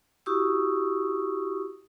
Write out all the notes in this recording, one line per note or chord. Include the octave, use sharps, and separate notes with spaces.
E4 F#4 G4 C#6 D#6 E6